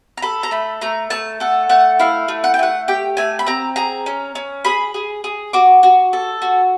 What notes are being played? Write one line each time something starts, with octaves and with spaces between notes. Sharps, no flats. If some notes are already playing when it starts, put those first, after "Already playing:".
A#5
A4 B5
A#5
A3 B5
A3 A#5
A3 A5
A4 F#5
A3 F#5
E4 F5
A3
F#5
G5
A3 F#5
G4 G5
A3 G#5
B5
C4 A#5
G#4 A#5
C#4
C#4
G#4 B5
G#4
G#4
F#4 D6
F#4
A4
F#4